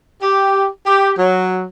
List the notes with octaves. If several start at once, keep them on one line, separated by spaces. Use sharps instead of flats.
G4
G4
F#3